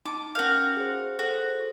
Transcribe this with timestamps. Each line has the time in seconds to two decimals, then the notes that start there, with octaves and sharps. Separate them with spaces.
0.05 D#4 A5 D6
0.35 C#4 F#4 A#4 F5 G6
0.77 G#4 C5
1.19 F#4 A4 C5